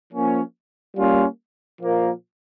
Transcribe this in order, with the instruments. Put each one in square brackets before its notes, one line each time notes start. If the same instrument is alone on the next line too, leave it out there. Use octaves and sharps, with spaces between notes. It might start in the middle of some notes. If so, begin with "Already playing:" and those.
[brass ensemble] F3 A#3 C#4
G3 A#3 C#4 F4
A#2 F3 A#3